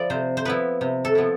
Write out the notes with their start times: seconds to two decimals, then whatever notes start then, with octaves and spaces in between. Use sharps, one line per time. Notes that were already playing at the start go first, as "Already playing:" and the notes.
Already playing: F3 E4 D5
0.10 C3 C5
0.37 C5
0.45 F3 B3 E4 B4
0.81 C3
1.05 A4
1.15 F3 B3 E4